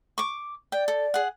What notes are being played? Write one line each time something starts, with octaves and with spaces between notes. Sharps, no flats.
C#6 D6
D5 G5
A4
G#4 F#5